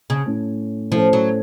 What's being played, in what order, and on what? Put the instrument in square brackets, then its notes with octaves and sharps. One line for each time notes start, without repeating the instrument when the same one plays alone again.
[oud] C#3
[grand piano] A2 A3 C#4
[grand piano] A2 A3 C#4 [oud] F3
[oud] F#3